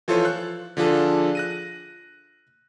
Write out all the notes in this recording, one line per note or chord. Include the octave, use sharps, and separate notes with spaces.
E3 F3 F4 A4 C5 C#5
F#6
D3 F3 D4 F4 G#4 A4
F#6 A#6 D#7